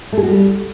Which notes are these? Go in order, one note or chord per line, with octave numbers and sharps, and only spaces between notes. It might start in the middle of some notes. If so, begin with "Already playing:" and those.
A3
G#4
F#4
G3